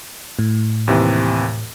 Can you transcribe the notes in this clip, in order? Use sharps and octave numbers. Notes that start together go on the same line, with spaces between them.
A2
D#2 C3 E3